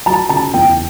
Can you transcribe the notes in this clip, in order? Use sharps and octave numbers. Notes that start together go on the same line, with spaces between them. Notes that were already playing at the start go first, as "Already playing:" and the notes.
F#3 A5
C#3 A5
E2 G5